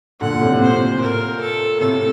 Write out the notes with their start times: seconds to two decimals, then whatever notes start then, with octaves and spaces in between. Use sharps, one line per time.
0.21 A#2 D3 F#5
0.31 A#2
0.41 A2 C3
0.51 A2 C3
0.61 A#2 C5
1.01 A#4
1.41 A4
1.80 A2 C3 A4